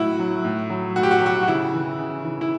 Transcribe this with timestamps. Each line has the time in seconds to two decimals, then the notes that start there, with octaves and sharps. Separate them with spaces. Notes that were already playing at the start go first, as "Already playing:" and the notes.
Already playing: A2 F#3 E4 F#4
0.19 F#3
0.45 A2
0.70 F#3
0.96 A2 F#4
1.03 G4
1.11 F#4
1.18 G4
1.22 F#3 F#4
1.43 F#4
1.48 C#3 E4
1.74 E3
1.98 C#3
2.24 E3
2.41 E4